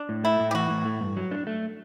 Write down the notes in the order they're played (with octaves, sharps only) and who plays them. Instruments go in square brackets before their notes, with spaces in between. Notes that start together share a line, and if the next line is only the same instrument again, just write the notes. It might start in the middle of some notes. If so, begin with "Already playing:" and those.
Already playing: [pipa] D4
[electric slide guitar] A2
[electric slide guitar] A3 [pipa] E4
[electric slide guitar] A2
[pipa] G4
[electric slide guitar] E3 [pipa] F#4
[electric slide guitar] A2
A3
G2
F#3
D4
A3